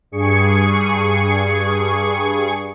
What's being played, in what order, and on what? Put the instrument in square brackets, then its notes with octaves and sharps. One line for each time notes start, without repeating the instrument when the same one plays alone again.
[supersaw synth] G2 G#4 C#6 C#7